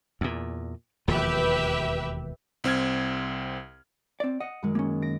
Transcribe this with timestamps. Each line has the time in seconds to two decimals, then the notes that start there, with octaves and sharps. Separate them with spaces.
0.21 E2 A#2
1.08 E1 D#2 F3 G4 B4 E5
2.64 C2 C4 F6 G#6
4.20 C4 D5
4.40 D#5 F#5
4.63 F#2 D#3 G#3
4.75 A#3 C#4
5.02 A#6 D7